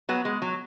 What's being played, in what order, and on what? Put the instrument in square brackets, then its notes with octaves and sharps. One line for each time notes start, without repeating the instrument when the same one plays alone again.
[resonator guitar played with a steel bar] F#3 B3
G#3
F#3